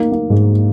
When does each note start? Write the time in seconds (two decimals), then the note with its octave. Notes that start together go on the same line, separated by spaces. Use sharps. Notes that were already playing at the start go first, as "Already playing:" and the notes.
Already playing: A#3 D#4
0.12 A#3
0.30 G#2